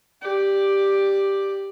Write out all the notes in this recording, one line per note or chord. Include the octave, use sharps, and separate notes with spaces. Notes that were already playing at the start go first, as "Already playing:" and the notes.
G4 D5